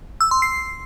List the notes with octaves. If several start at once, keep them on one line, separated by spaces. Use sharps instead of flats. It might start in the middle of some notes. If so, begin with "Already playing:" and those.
E6
C6
C7